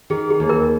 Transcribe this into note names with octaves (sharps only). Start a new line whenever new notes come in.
D#3 G#4
G#4
D#2
A#4